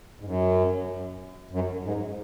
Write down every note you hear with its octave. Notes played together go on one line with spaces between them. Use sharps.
G#2
F#2
F#2
G#2